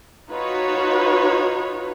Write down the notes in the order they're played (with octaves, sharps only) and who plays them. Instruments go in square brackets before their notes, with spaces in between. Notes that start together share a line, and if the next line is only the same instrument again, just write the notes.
[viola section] D#4 F4 F#4 B4 C#5